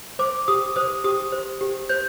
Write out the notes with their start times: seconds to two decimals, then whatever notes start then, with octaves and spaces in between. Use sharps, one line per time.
0.19 C5 D6
0.48 G4 D#6
0.76 C5 D#6
1.04 G4 D#6
1.32 C5
1.61 G4
1.89 C5 G6